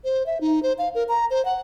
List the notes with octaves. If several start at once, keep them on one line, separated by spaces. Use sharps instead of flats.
C5
E5
D#4
C5
F5
A#4
A#5
C5
F#5